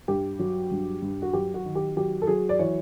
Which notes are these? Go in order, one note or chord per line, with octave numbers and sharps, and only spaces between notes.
G2 G4
F#3
G2
G2
F#4
F#3 G4
F#4
D#3
G4
F#3 G4
A4
F#3 G#4
D5
E3 C#5